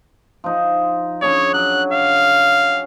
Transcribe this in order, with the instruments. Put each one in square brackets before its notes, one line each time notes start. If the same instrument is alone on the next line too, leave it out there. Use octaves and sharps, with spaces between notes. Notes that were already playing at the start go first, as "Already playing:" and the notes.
[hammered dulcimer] F3 D#4
[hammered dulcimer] C#4 D4 G#4 [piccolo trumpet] C#5
[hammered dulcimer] F#3 [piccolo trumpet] F#6
[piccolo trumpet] F5